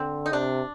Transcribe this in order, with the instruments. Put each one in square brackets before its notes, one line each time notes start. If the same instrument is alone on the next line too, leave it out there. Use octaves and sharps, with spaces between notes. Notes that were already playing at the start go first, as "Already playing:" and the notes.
Already playing: [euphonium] D3 [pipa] C4
[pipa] D#4
[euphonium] C3 [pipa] D4